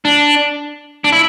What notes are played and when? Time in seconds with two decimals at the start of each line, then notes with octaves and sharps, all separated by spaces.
0.05 D4
1.04 D4
1.12 E4